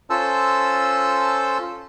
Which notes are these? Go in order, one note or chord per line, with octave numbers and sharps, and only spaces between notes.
C#4 F4 A4 C5 A5 E6